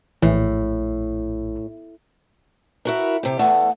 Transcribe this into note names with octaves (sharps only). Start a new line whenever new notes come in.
A#1 A2 E3
E4 F#4 A#4
C3 G4
E2 A3 F#5